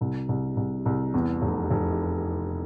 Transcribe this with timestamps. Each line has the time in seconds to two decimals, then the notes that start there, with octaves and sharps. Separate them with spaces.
0.01 C2
0.29 C2
0.57 C2
0.86 C2
1.14 E2
1.42 F1
1.70 F1